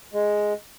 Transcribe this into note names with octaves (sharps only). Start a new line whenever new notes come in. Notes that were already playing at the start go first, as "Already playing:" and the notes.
G#3